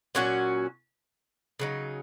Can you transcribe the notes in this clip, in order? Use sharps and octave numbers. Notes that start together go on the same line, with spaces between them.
A#2 F#3 C#4 F#4
C#3 F#3 D#4